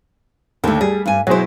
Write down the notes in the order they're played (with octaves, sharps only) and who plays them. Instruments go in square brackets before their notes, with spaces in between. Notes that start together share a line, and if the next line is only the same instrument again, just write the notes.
[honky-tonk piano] D#2 [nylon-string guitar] D3 A3
[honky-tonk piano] G3 [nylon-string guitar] G#4
[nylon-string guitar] G2 G#5
[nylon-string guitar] B2 E4 [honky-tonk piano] F#3 G#4 C5